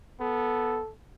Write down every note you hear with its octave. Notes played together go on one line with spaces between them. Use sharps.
B3 A4